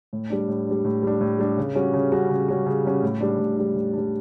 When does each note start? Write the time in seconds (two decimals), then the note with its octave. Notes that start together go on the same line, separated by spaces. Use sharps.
0.13 A2
0.30 G3 D4
0.48 A2
0.67 G3 D4
0.85 A2
1.03 G3 D4
1.21 A2
1.39 G3 D4
1.57 C#3
1.75 G3 C#4 F#4
1.94 C#3
2.12 G3 C#4 F#4
2.30 C#3
2.48 G3 C#4 F#4
2.66 C#3
2.85 G3 C#4 F#4
3.03 A2
3.21 G3 D4
3.38 A2
3.57 G3 D4
3.75 A2
3.93 G3 D4